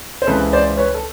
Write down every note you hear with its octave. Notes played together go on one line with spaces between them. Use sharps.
C5
C#2 C#3 E3 A4 B4
C5 D5
B4 C#5
A4